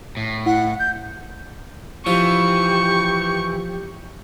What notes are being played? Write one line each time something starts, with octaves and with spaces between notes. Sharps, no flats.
A2
E4 F#5
G6
E3 F3 G4 C#6